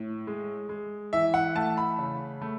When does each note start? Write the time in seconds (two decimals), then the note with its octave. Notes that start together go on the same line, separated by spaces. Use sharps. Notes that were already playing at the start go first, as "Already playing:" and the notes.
Already playing: A2
0.27 G#3
0.69 G#3
1.13 E3 E5
1.34 F#5
1.55 A3 A5
1.77 B5
1.99 C#3
2.41 A3